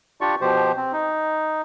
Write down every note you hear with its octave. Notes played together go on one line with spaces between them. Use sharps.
D4 F4 G4 D5 C#6
B2 F3 G4 C5
C4
D#4